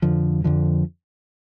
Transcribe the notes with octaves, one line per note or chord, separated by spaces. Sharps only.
F2 D3 F3
F2 D3 F3